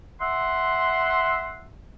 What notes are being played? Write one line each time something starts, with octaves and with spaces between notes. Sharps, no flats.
E5 F#5 C6